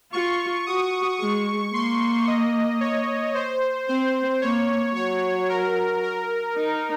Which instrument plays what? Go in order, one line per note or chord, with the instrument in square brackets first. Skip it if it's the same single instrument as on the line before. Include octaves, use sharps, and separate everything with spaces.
[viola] F4 [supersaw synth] C#6
[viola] F#4 [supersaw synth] D#6
[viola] G#3 [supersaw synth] C#6
[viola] A#3 [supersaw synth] C6
[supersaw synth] D#5
C#5
C5
[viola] C4 [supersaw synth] C5
[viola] A#3 [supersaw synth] C#5
[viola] F#3 [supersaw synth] C#5
[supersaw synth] A#4
A#4
[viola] D#4